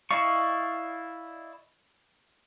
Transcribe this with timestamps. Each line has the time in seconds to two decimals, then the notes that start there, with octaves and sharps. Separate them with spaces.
0.11 E4 D5 D#5 F5 C#6